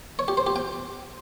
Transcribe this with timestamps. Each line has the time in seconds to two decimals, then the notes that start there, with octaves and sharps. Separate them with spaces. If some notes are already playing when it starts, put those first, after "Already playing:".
0.19 C#5
0.28 G4
0.37 C5
0.47 G4
0.56 G5